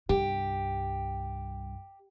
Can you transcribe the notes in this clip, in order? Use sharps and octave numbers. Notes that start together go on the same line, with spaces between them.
C2 G2 G4